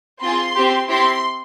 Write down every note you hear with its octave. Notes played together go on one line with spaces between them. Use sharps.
C4 F4 G#4 C6
C4 G4
C4 E4 G4 C6